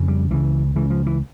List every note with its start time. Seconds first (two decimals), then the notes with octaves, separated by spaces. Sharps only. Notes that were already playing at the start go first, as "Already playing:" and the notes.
Already playing: F2 C#3
0.08 G3
0.31 C#2 C#3 E3
0.76 C#2 C#3 E3
0.90 F3
1.06 E3